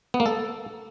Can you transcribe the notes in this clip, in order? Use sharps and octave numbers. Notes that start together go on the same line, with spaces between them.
B3
A#3
A4